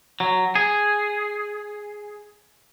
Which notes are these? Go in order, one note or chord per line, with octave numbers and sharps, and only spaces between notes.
F#3
G#4